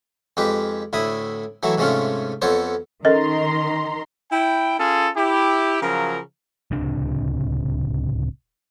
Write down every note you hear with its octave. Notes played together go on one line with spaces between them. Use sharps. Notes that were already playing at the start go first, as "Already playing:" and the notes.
F2 G#3 G4 B4
D2 A2 E4 B5 D#6
E3 F#3 A3 E4
G#2 C3 G#3 A3 C#4 F4
F2 B3 A4 C5 C#5
D#3 C#4 A4 A#4 D#5 A#5 C6
E4 G5
C#4 F4 G#4 A4
E4 G4
C#3 F3 F#3 A#4
D1 C#2 C3 D4